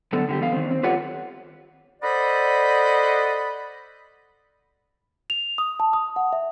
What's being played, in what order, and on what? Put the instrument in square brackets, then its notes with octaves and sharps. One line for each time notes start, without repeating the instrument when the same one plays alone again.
[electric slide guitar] F#2 D3 B3 A4
D3 F#4 G4
E2 B3 F5
D#3 C4
C4
F4 G4 A4 B4 C#5 F#5
[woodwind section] A4 C5 D5 D#5 F#5 B5
[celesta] F7
D#6
A5
D#6
F#5
E5